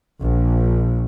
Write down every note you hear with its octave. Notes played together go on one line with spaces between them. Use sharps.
A#1